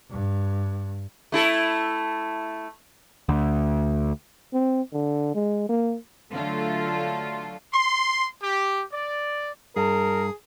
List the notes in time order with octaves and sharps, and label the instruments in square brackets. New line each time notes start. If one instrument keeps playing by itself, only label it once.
[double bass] G2
[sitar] A3 E4 A4
[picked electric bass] D2
[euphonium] C4
D3
G#3
A#3
[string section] D3 F#3 A3 F4 A4
[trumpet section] C6
G4
D5
[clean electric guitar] G2 [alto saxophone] G#4 [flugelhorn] A#4